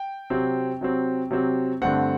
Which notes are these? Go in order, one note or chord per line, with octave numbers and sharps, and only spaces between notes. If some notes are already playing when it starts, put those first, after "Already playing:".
Already playing: G5
C3 F#3 C4
C3 F#3 C4
C3 F#3 C4
G2 D3 A3 C4 F#5